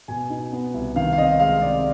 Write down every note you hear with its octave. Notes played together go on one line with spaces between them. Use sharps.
B2 G#5
D#4
B3
C2
D#3 F5
F5
C4 D#5
G#3 F5
C3 D5